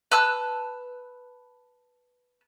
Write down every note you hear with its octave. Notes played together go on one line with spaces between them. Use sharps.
B4 A5 E6 F#6